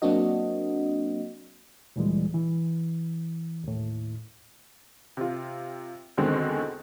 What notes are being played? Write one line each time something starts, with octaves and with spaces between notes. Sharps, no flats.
F#3 A#3 C4 D4 F#4 D#5
D2 A#2 E3 G3 G#3
E3
D#2 A2
C3 F4
E2 B2 D3 D#3 G#3 C4